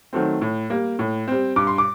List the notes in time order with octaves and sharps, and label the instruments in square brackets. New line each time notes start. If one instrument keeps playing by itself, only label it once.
[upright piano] D#3 F#3 A3 C4
A2
G3 A#3
A2
G3 C4
G2 D6
C6
D6